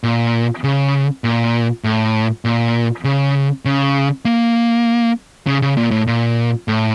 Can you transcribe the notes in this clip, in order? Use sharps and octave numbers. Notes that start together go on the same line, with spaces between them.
A#2
C#3
A#2
A2
A#2
C#3
C#3
A#3
C#3
C#3
A#2
A2
A#2
A2